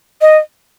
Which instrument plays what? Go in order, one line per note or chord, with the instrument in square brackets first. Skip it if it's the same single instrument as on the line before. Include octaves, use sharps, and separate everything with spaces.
[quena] D#5